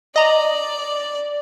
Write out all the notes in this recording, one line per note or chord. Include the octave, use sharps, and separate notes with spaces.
D5 D#5 A#5